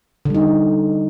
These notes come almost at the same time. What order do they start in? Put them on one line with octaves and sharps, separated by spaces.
D3 G3 D#4